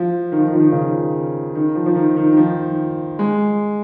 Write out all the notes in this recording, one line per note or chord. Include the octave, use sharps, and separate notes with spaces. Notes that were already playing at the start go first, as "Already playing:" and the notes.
Already playing: F3
D#3
F3
D#3
F3
D#3
C#3
D#3
F3
F3
D#3
D#3
D#3
F3
G#3